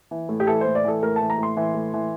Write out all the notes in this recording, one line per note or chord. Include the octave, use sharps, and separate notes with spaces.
E3
A2
G4
E3 A4
C5
A2
D5
E3 A4
A2 A#4
E3 A5
A#5
A2 C6
E3
A2
E3